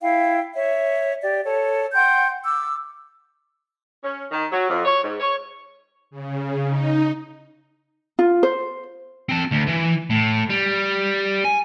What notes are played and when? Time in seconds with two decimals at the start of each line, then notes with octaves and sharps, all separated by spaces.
0.01 E4 F5 G5
0.54 C#5 E5
1.22 G4 D5
1.43 A4 C#5
1.94 F#5 G5 C6 G6
2.45 D6 E6
4.03 C#4
4.32 D#3
4.51 F#3
4.69 F2
4.85 C#5
5.03 G#2
5.20 C#5
6.11 C#3
6.67 D#4
8.19 F4
8.43 C5
9.29 C4 A5
9.52 D2
9.68 E3
10.10 A2
10.50 G3
11.45 G#5